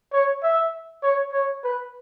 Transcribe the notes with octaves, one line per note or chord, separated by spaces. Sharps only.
C#5
E5
C#5
C#5
B4